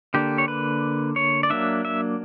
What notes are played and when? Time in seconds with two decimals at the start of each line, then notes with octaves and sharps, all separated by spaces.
0.14 D3 A#3 D4 G4
0.38 C#5
0.48 B4
1.16 C#5
1.43 D5
1.50 F#3 A#3 D4 E5
1.85 E5